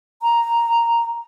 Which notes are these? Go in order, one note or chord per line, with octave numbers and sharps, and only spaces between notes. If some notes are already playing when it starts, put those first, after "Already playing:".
A#5